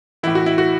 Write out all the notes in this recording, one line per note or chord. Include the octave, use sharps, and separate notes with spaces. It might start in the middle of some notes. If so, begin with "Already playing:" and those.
A2 E3 E4
F#4
E4
F#4